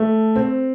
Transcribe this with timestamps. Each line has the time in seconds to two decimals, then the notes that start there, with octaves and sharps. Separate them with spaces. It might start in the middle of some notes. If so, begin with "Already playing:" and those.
Already playing: A3
0.36 C4